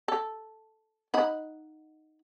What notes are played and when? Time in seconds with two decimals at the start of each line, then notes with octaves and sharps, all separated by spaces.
0.08 A4
1.14 D#4 F#5 B5